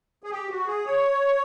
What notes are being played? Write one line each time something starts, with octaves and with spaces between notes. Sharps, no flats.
G#4
G4
F#4
G#4
C#5